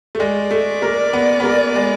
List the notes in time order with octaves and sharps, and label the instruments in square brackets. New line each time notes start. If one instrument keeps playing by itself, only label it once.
[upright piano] A3
[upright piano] G#3 [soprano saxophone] D5
[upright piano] A3
A#3
B3
B3
A#3
G#3